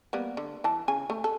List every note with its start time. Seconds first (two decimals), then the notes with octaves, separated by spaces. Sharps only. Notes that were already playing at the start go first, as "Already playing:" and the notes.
0.13 G3 A#3 B3
0.37 D3
0.64 E3 A5
0.88 C#3 G#5
1.10 A3
1.24 A4